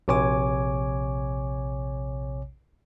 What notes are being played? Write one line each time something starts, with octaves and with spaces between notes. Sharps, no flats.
A#1 C3 C#5 G#5 D6